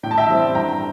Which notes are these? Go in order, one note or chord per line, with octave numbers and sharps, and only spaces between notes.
A2 G5
A5
E5 G5
G3 C4 E4
G2 G5 A#5